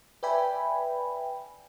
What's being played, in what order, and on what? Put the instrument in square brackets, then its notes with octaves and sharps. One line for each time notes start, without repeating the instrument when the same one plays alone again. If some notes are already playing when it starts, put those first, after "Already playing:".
[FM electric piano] B4 D5 E5 G5 G#5 B5